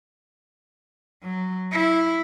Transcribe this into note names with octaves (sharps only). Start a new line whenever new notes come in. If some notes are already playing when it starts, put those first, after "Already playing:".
F#3
E4